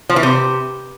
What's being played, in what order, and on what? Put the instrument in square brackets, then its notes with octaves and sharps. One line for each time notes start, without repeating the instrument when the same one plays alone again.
[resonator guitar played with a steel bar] F3
E3
C3